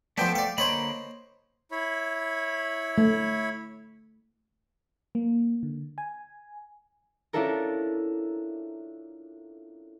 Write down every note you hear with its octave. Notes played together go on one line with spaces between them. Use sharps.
F3 A3 B3 D4 A4 G5
D5 F5
D3 A#3 C5 C#5 D#5 B5
E4 C#5 B5
A3
A#3
D3
G#5
C#4 D4 E4 F4 A4 A#4